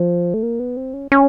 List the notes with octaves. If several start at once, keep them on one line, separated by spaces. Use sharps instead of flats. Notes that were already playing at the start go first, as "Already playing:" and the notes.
Already playing: F3
A3
A#3
B3
C4
C#4
C#4